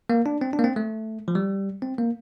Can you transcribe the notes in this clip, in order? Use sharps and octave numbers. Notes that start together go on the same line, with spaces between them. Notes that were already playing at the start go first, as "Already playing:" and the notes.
A#3
D4
C4
D4
A#3
C4
A3
F3
G3
C4
A#3